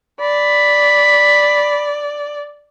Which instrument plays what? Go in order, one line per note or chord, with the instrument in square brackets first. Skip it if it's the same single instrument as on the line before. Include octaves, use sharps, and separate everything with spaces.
[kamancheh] D5 [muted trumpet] B5